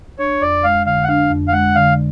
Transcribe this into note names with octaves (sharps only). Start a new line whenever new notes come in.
D4 C#5
F2 D5
G#3 F5
D3 F5
F#5
D4 F5
F2
F5
G#3 F#5
D3 F5